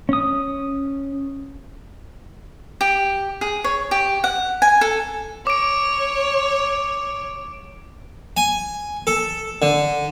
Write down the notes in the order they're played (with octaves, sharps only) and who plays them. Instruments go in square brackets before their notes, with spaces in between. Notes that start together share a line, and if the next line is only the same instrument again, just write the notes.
[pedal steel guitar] C#4 D#6
[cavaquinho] G4
G#4
C#5
G4
F#5
G#5
A4
[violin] C#5 [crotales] D6 D7
[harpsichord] G#5
A4
D3